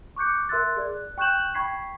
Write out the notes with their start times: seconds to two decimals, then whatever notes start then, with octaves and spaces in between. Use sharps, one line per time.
0.16 C#6 D6 F#6 G6 C#7
0.49 A#4 E5 C6 E6 F#6 A6
0.77 G#4 D5
0.91 F#6
1.18 G5 C#6 F#6 G6 E7 F#7
1.55 G5 B5 C#6 G#6 B6 C7